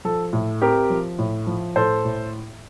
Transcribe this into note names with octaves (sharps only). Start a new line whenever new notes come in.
F3 A4
A2
C4 G4 A#4
F3
A2
F3
A2 A4 C5
A2